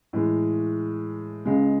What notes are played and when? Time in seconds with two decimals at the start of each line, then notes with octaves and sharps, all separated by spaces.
0.13 A2 E3 G#3
1.45 C#2 C#3 G#3